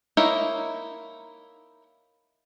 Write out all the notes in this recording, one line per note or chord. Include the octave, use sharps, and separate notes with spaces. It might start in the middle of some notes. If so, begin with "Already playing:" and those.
A#3 D#4 E4 A#4 C#5